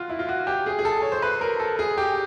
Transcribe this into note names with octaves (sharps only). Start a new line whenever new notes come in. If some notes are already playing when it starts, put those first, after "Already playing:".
Already playing: F4 F#4
E4
F4
F#4
G4
G#4
G#4
A4
C#5
C5
B4
A#4
A4
G#4
G4